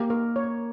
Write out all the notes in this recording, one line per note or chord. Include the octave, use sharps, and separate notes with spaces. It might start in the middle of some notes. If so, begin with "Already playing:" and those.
Already playing: A#3 G4
A#4
C#5